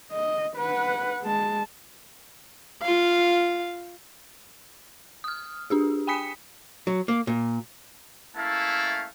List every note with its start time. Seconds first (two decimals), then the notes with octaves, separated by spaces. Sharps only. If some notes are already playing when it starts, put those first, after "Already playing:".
0.12 D#5
0.57 B4 F#5
1.21 G#3 A5
2.82 F4 F5
5.24 D#6 F6
5.70 D4 G4 G#4
6.07 G5 G#5 B5 D#6 B6 C#7
6.87 F#3
7.08 A#3
7.27 A#2
8.36 A3 A#3 C#4 E4 F5 A5